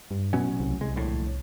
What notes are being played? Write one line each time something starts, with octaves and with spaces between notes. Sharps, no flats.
G2
A1 B2 F#3 C#4
C2
C2 G#3
D1 A#1 A2